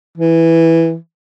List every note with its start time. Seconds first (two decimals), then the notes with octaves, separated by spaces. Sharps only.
0.18 E3